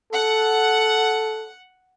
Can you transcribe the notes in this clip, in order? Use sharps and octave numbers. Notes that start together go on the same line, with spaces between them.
A4 F#5